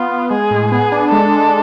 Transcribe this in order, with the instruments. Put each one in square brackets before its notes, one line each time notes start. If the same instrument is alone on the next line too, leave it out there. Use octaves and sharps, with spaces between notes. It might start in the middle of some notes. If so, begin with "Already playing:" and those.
Already playing: [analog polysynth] B3 [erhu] F4
[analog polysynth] B3
[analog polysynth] G#3 [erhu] G#4
[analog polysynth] A2
[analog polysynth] B3 [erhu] G#4
[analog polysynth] D4
[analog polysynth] G#3 [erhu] A4
[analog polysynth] G#3